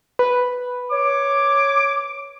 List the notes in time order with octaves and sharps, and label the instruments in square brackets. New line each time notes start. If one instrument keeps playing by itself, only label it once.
[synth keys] B4
[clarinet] C#5 [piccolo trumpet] D6